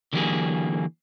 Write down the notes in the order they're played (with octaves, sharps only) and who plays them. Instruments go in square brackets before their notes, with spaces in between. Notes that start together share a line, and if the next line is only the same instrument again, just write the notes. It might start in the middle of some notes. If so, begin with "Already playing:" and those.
[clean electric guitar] D3 E3 F#3 A#3 G4 G#4